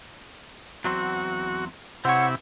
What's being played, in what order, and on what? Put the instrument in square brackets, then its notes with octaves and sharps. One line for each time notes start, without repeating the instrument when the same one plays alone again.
[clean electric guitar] E2 F#3 C4 [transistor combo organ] F#4
[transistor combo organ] C3 E4 [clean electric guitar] C4 C#5 [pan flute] F#5